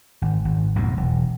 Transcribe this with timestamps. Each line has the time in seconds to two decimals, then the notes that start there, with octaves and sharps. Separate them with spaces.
0.22 G#1
0.45 G#1
0.76 B1 F2 A2
0.97 E1